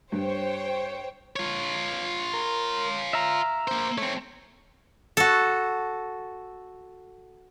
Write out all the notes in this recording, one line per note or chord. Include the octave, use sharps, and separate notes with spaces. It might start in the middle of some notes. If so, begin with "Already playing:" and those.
G2 C5 C#5 G5
F4 C#5
A#4
E5 F5 A#5
A#3 C5
A3 C4 C#5
F#4 A4